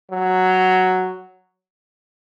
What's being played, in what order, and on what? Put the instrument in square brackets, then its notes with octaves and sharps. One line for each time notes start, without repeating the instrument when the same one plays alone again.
[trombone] F#3